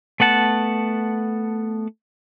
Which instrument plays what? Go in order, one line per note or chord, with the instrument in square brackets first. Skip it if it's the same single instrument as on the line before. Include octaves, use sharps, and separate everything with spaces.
[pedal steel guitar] A3 B3 F#5 A5